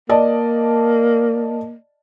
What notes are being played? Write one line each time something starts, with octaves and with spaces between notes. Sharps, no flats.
A#3 D5 D#5 A5